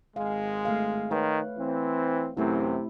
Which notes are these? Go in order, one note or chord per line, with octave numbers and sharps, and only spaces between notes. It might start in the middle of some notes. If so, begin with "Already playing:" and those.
G#1 G#3 F5
A3 F5
D#3 B4 C#5
E3 C4
F#2 C3 E3 A3 C4 E4